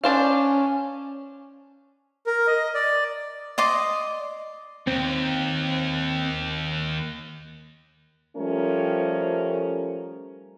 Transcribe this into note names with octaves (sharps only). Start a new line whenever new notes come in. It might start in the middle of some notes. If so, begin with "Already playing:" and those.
C#4 D4 C5 F5
A#4
D#5
D5
D5 D#5 C6 D6
D#2 C4
F3 G3 A3 C#4 A#4 C5